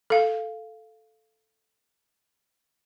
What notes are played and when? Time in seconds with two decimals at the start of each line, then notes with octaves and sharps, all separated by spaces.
0.10 A4 F5